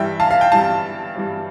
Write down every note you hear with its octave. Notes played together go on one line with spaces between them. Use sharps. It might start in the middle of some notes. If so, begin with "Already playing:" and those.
Already playing: G2 E3 G3 E5 G5
F5 A5
F5
G5
G2 E3 G3 F5 A5
G2 E3 G3